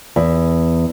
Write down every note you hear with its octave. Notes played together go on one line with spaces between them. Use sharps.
E2